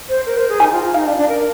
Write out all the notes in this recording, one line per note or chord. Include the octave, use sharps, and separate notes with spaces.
C5
A#4
C5
G#4
D#4 G#5
F4
D#4 F5
D4
D4
A#4